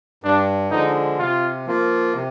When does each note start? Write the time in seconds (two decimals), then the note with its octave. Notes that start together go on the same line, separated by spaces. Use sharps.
0.24 G2 D4
0.71 D3 F3 G#3 D#4
1.18 C3 F4
1.66 F3 A#3 F4
2.14 C3